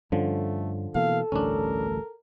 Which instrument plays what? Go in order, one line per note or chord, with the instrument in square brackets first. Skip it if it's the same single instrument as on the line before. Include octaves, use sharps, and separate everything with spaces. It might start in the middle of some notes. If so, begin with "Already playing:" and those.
[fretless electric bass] G2 C#4 [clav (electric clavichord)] D3 F3 [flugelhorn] A3
[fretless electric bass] B2 E3 A#3 [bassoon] A4 [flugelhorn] F5
[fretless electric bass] A1 D2 G2 [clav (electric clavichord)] C#4 D4 [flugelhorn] A#4